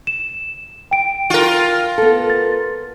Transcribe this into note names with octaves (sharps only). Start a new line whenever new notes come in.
E7
G5 D7
F4 A#4
B3 A4
A6